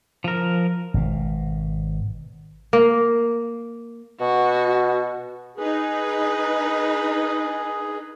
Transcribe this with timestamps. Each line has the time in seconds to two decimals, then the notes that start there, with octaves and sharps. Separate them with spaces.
0.24 F3 A#4
0.94 G#1 B2
2.73 A#3
4.21 B2 F#4
5.57 D#4 G#4 B4